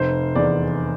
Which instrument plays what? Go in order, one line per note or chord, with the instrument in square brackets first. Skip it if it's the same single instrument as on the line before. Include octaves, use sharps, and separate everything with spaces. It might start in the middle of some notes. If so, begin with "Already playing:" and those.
Already playing: [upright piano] F1 C5
E2 D5